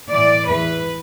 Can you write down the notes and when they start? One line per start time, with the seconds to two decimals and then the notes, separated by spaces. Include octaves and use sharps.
0.12 A2 E3 D5
0.48 E2 E3 B4